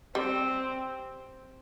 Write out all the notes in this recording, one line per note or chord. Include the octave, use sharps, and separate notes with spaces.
G3 C4